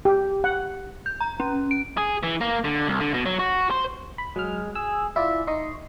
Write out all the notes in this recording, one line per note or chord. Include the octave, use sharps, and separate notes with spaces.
G4
F#5
G6
A#5
C#4
D7
G#4
E3
A#3
D3
C2
D3
B2
F#3
F#4
C5
B5
F#3 G#3 F6
G#4 E6
E4 F4 D5 E5
D#4 D#5 C6 C#6